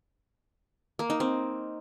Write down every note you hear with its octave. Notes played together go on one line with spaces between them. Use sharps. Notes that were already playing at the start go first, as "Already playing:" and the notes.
A#3
D#4
C4